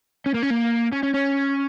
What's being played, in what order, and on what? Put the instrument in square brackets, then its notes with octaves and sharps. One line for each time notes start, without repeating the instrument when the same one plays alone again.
[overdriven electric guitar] C#4
A#3
C#4
A#3
C#4
C#4
C#4